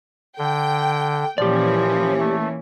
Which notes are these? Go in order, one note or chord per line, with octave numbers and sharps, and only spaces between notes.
D3 G5
A#2 E3 F3 C#4 G4 D5
A3